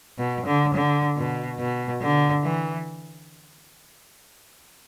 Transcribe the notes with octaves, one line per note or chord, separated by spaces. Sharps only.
B2
D3
D3
B2
B2
D3
E3